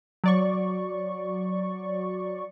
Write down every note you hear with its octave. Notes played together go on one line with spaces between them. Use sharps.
F#3 D5 C#6